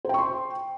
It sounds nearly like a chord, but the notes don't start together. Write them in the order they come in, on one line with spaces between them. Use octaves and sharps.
C5 G5 C#6 C6